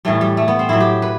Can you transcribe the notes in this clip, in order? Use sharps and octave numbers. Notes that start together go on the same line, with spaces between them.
A2 E3 G3 A3
G3
A3
B3
C4
A2 F#3 E4
G4
B4